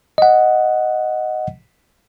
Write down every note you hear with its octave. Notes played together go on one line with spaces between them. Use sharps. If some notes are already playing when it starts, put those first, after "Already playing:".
D#5 F#5